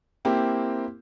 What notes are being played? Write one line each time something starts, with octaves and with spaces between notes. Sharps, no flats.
A#3 C4 E4 G4